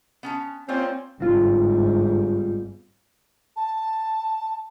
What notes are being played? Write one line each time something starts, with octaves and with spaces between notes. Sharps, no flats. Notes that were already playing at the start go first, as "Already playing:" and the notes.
B3 C#4 A5
A#3 C4 C#4 F4 D5
G1 G#2 G3 C4 F4
A5